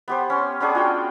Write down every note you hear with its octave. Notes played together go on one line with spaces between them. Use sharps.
B3 G4 C5
C#4 C6
B3 C#4 D4 G#4
F4 F#4 G5